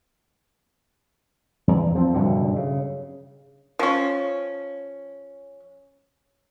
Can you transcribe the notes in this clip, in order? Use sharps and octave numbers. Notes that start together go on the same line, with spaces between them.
E2
F3 C4
F#1 G2 B2 D3
C#3
F3 C#4